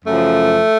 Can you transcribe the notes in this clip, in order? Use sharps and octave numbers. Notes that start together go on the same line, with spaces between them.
F#2 C#3 F3 A3